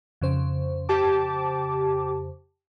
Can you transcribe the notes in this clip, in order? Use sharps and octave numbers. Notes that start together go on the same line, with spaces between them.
F2 C#3 C5
G4 A5 D6